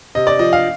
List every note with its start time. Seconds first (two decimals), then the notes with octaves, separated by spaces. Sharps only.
0.15 C3 D#5
0.27 D5
0.39 F3 D#5
0.53 F5